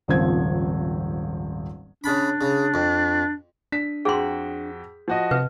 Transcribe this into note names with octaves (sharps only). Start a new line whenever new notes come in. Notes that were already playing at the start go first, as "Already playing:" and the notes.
D#1 G#1 C#3 F3 C4 G#6
C#3 D4 B5
C#3
F2
D4 B6
F2 F#4 G#4 G5 C6
F3 F#4 D#5
C3 B4